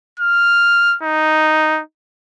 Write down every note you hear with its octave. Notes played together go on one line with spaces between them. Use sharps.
F6
D#4